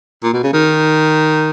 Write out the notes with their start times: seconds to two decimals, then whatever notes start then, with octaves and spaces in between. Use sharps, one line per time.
0.23 A#2
0.33 B2
0.43 C#3
0.53 D#3